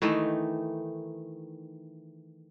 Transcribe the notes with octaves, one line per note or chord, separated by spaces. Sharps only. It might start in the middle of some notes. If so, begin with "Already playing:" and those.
D#3 E3 A3 D#4